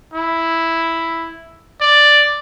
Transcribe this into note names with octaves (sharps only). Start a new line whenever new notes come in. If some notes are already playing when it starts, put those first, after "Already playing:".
E4
D5